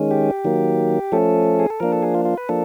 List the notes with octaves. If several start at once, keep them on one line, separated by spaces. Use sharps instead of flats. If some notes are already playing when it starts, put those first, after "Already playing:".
Already playing: D#3 G#3 C#4
G4
D#3 F#3 A#3
F3 A3 C#4 A4
G#4
A4
F3 A#3 D4 A#4
A4
G#4
F4
F4
B4
F3 A#3 D4 A4